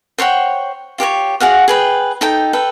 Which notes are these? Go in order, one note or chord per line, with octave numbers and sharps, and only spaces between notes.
C5 C#5 F#5 G5
F4 G4 C5 C#5
F#4 G#4 F5 F#5
G#4 B4 G5
D#4 A4 G5
A4 B4 G5